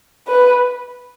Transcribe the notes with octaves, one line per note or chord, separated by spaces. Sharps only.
B4